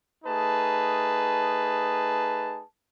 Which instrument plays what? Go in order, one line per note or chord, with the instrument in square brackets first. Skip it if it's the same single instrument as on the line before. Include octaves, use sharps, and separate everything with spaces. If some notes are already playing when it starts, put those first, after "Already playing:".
[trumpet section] A3 D#4 G#4 B4 A5